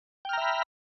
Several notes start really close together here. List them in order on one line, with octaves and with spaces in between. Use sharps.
G5 F6 A#5 E5 B5